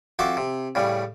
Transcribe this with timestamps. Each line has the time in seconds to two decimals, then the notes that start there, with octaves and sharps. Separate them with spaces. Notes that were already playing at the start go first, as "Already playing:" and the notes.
0.19 F2 F#4 E5 C6 D6
0.37 C3
0.75 A2 C#3 G3